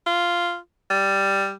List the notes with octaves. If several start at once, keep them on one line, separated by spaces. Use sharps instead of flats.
F4
G3